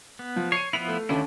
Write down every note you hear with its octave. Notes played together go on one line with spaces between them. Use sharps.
B3
F3
C#5 C7 C#7 D#7
F3 B3 E4 F7
A3
D#2 D3 A3 C#4 D4 E4